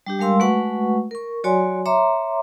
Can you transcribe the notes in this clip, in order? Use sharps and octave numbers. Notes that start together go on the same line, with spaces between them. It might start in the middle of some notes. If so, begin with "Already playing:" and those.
G3 D4 G4
G3 G#3 A#4 F5 C6 E6
G#3 A3 F#4 B4 F#5 C#6
A#4 C#6
F#3 F#4 C#5 D5 G#5 C6
C#5 E5 A#5 C6 D6